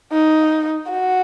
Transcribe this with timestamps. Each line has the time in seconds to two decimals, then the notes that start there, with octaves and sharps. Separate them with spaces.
0.12 D#4
0.90 F#4